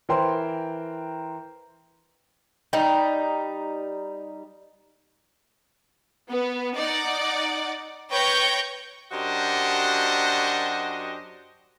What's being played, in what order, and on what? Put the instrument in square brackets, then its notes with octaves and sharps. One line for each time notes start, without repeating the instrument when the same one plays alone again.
[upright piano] E3 A#4 C5 G5 C6
[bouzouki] G3 D#4
[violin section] B3
D#4 D5 F#5
B4 C#5 G5 C#6 G6 A#6
[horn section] F#2 D4 F#4 G4 C5 D#5